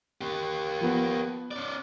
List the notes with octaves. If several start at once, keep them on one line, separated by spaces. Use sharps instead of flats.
A#3 G4
F3 B3
C#4 D5